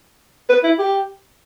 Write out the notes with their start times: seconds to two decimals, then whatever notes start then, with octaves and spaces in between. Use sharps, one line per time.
0.50 B4
0.64 E4
0.79 G4